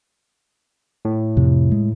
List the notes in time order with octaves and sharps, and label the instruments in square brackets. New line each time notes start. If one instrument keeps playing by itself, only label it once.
[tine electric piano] A2
[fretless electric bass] F2 C3
G#3